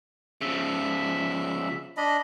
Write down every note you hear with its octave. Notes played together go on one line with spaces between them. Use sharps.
C#3 F3 E5
D4 D#5 B5